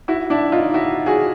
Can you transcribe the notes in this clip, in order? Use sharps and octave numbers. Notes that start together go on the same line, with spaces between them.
E4 F#4
D4 E4
D#4 F4
E4 F#4
F#4 G#4